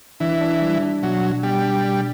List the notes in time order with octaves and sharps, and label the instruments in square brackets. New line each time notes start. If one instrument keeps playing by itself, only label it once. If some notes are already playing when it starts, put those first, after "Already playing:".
[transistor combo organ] E3 [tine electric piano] D4
[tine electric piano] D4
G3
D4
[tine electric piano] B2 [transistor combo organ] F#3
[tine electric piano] D4
[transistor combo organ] G3 [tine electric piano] B3
[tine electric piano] D4
B2